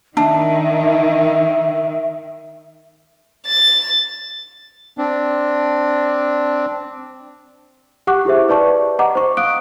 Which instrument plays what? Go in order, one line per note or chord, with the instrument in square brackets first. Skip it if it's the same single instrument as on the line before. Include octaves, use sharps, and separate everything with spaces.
[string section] D#3 [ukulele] D4 [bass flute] E5
[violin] A6
[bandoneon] C4 D4
[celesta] G4 F#5 C#6 D6 F#6
E4 G4 G#4 C5 E5
B4 D5 A5 C#6
D#5 F#5 A#5 D6
C5 C#6
F5 D#6 F#6 D7